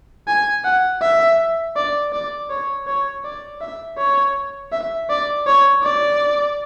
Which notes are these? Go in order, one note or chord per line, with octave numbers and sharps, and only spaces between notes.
G#5
F#5
E5
D5
D5
C#5
C#5
D5
E5
C#5
E5
D5
C#5
D5